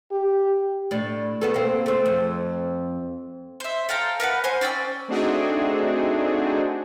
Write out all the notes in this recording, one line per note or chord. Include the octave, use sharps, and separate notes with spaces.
G4
A2 D4
A3 B3 A4
A#3 C4
A3 C4
F2
C5 E5
A4 F5 G5 A#5
A#4 B4 F5 F#5
C5 G#5
C#4 D5 G5 E6
A3 C4 D4 D#4 F#4 G#4